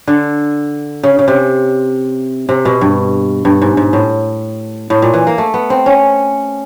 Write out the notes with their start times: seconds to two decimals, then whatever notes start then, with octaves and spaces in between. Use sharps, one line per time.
0.07 D3
1.03 C#3
1.19 C#3
1.28 C3
2.49 C3
2.65 B2
2.81 G2
3.45 G2
3.62 G#2
3.77 G#2
3.93 A2
4.90 A2
5.02 A#2
5.14 E3
5.27 A#3
5.38 A3
5.54 B3
5.70 C4
5.86 C#4